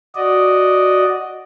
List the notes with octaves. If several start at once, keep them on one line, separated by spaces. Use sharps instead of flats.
F#4 D5 D#5